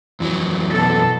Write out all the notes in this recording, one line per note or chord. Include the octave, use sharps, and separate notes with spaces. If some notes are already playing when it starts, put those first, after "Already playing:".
F2 E3 F#3
B2 A4